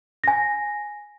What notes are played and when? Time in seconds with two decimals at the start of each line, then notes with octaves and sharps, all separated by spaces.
0.24 G#5 A#6